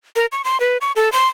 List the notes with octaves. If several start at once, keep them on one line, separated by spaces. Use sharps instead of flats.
A#4
C#6
C6
B4
C#6
A4
C6